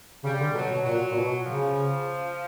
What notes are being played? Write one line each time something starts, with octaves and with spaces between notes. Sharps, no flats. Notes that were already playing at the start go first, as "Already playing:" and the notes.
C#3 G3
D3
B2 F#3
B2
A#2 F#3
A#2
B2
C#3 F3